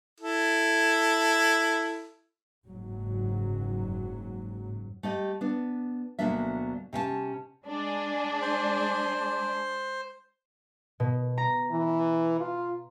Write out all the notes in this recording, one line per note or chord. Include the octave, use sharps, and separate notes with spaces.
E4 A4
F#1 G#2 F#3
A3 G4 D#5
B3 D4
D2 B2 F#3 A#3 D4 E5
C3 C#4 E5 A5
G#3 D4 G#4
C5
B2
A#5
E3
F4